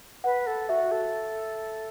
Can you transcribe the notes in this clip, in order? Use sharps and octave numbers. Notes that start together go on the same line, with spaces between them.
B4 F#5
A4
F#4 E5
A4